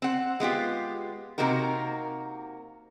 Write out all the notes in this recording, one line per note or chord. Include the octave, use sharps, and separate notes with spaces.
C4 F#5
G#3 B3 F4 G4
C3 A#3 D#4 F#4 A#4